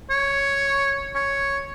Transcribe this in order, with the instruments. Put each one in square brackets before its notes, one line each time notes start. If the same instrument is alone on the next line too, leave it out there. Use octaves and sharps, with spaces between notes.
[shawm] C#5
C#5